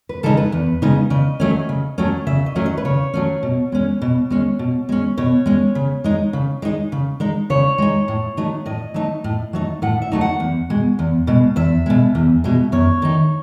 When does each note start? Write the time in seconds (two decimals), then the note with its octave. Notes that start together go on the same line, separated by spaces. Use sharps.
0.09 B4
0.23 C#3 G#3 D#4 A4
0.37 B4
0.52 E2
0.82 C#3 G#3 D#4
1.10 C#3 D#5
1.40 F#3 A3 C#4
1.69 C#3
1.98 F#3 A3 C#4
2.27 C#3 E5
2.46 D#5
2.55 F#3 A3 C#4
2.66 D#5
2.77 B4
2.85 C#3 C#5
3.14 F#3 A3 C#4
3.43 B2
3.72 G#3 C#4
4.02 B2
4.30 G#3 C#4
4.59 B2
4.89 G#3 C#4
5.17 B2 C#5
5.46 G#3 C#4
5.75 C#3
6.04 G#3 D#4
6.33 C#3
6.62 G#3 D#4
6.92 C#3
7.20 G#3 D#4
7.50 C#3 C#5
7.78 G#3 D#4
8.08 A2
8.37 F#3 A3 D#4
8.66 A2 D#5
8.94 F#3 A3 D#4
9.24 A2
9.53 F#3 A3 D#4
9.82 A2 F#5
10.02 E5
10.12 F#3 A3 D#4
10.21 F#5
10.40 E2
10.70 B2 G#3
10.99 E2
11.27 B2 G#3
11.56 E2 E5
11.86 B2 G#3
12.15 E2
12.44 B2 G#3
12.72 F#2 C#5
13.02 D#3 A3 D#4